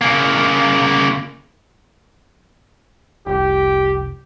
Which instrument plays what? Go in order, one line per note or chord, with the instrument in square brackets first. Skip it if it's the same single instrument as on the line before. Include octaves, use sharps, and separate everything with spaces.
[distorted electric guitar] C#3 A#3
[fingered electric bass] F1 C2 [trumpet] G4